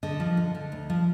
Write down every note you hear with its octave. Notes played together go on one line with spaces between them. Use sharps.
D3 D#5
F3
D3
D3
D2
F3